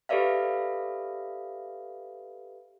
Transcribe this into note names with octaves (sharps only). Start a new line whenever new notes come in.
G4 A4 B4 D5 E5 F5